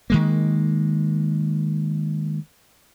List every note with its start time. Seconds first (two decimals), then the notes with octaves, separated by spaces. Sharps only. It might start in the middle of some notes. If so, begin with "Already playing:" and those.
0.10 D#3 G#3 A#3